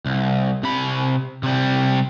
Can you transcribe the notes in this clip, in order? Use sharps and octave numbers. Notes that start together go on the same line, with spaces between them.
C2
C3 B5
C3 G3